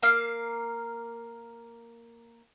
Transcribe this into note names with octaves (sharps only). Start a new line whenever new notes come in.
A#3 F5